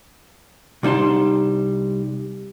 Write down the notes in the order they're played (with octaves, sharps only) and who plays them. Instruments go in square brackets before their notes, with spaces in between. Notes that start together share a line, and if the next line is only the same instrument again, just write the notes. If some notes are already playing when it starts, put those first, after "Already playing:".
[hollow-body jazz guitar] C2 G3 D#4 A5 C6